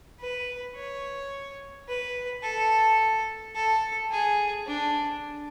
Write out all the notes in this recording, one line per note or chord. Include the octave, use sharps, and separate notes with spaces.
B4
C#5
B4
A4
A4
G#4
D4